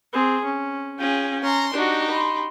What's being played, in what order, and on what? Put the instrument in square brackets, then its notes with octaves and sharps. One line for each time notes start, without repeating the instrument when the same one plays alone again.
[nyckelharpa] C4 G#4
C#4
[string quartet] C#4 F4 G#4 [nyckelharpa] G5
[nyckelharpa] C#4 [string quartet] A#5 C6
[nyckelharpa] D4 F#4 [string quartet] D#4 G4
[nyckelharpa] B5 C6